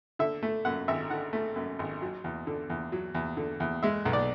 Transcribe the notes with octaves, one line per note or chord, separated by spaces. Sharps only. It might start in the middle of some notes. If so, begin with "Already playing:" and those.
D3 E5
A3
F#2 F#5
G#1 E5
D3 F#5
A3
F#2
G#1
F#3
E2
D3
E2
F#3
E2
D3
E2
G#3 E5
B1
D5